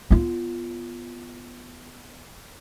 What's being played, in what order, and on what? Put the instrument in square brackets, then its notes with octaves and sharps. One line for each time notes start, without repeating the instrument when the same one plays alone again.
[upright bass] B3 F4